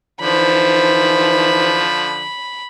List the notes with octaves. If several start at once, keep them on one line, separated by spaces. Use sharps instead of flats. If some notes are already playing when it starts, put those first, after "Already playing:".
D3 E3 F3 D#4 C5 B5